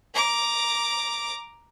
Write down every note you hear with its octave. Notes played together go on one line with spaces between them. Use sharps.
A#5 D6